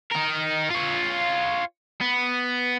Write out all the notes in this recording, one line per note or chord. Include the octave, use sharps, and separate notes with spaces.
D#4 A#4
F4 C#5
B3